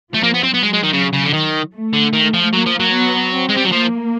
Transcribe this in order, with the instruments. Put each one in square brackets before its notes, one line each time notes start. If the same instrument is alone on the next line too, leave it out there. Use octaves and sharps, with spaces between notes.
[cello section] F3 [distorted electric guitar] A3
[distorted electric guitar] A#3
B3
C4
[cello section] F#3 [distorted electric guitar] B3
[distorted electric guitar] G#3
G#3
D#3
C#3
C#3
D3
D#3
[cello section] A3
[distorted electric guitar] D3
D#3
F3
[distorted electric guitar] F#3 [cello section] A#3
[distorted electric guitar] F3
F#3
[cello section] B3
C4
[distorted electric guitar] G#3
G3
F#3
[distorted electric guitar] F3 [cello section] A#3